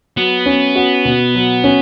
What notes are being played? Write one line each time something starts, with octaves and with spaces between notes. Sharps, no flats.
F#3 B3
C#4
F#4
B2
F#3
C#4